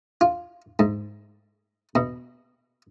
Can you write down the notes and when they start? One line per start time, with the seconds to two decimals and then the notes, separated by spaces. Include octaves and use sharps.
0.21 F4
0.79 G#2
1.95 B2